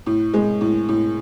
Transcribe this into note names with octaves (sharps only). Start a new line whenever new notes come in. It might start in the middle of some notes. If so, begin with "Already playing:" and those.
A2
G#3
A2
A2